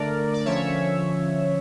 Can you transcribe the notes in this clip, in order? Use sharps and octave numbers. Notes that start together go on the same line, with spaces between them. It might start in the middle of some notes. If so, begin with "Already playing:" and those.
Already playing: D3 A3 D4 A#4 D5
D5
D3 F3 C#4 C#5 E5